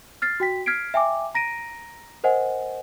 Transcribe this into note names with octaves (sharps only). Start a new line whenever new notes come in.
F6 A6 C7
F#4 G5 B6
F6 G#6 B6 C7 D7
E5 G5 G#5 D6
A#5 A#6 D7 D#7
A#4 C5 D#5 F#5 G#5